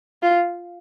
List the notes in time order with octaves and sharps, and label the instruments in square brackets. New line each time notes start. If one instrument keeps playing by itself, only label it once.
[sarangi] F4